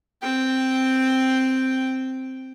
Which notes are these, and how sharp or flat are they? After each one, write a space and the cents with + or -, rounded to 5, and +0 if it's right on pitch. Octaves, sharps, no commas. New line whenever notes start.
C4 +0 G5 +0